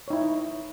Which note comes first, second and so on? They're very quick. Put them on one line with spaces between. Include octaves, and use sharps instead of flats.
C#5 D#4 E4